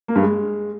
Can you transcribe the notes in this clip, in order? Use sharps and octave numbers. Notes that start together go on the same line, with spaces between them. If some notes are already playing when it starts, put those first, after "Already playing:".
A#3
G2
G#3